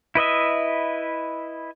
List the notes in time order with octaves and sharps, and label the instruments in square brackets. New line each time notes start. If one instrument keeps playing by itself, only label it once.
[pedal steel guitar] E4 B4 D#5 E5